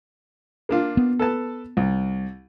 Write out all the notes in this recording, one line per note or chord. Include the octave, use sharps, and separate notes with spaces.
A#3 D4 F4
B3
A4 B4 A5
C2